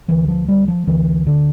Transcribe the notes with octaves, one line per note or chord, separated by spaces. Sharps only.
D2 D3 E3
F3
G3
F3
D2 D3 E3
D3